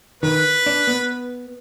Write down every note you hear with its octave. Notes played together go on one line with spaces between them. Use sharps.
D#3 B4
D4
B3